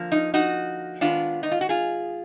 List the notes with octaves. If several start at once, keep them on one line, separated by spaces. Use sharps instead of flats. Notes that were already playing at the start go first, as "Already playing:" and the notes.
Already playing: D3 F3 A#3
D#4
D#4 F#4
D#3 G#3 B3 D4 F4
D#4
F4
F#4
F4 G#4